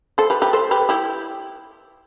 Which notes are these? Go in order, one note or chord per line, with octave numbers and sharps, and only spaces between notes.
A4 C5
G4 B4
G4 B4
A4 C5
G4 B4
E4 G4